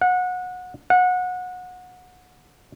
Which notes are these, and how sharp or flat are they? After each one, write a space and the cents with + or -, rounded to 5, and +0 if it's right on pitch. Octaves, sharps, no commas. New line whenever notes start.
F#5 -25
F#5 -25